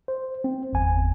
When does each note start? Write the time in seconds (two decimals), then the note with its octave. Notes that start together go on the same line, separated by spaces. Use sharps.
0.08 C5
0.44 C4
0.73 G1 E2 G#5